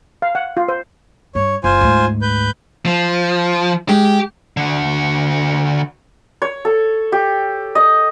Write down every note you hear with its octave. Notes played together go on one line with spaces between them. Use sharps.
F5
F#5
F4
C5
G2 C#5
F#1 F4 C5 G#5
D2 G#2
B4 G6
F3
G#3 G4
D3 F#4
C#5
A4
G4
D#5